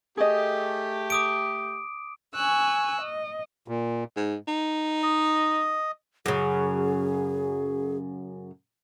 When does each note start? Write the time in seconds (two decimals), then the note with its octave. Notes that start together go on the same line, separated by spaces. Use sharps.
0.17 A3 G4 G#4 D#5
1.10 D6 D#6 D7
2.34 G#5 C#6 E6 F#6
2.99 D#5
3.68 A#2
4.17 G#2
4.48 D#4
5.03 D#5
6.26 F#2 C#3 G#4